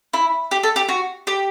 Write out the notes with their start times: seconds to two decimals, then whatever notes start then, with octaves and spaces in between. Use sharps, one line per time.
0.13 E4
0.51 G4
0.63 A4
0.76 G4
0.89 F#4
1.27 G4